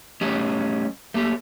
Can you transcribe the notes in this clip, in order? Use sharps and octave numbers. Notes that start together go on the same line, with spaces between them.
G3 A3 C#4 G4 D#5
A3 A#3 G4